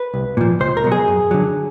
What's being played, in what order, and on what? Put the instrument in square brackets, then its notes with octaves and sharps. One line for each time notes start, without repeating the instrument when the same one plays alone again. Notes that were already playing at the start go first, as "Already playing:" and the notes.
Already playing: [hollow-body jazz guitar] B4
C2
A#2 F3
C#2 C5
A#4
B2 F#3
G#4
F#2
D3 F#3